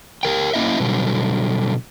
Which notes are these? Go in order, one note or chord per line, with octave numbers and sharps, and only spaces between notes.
G4 A#4 G5
F#3 A#3 C#4 E4 D#5 E5
B2 D3 F#3 G3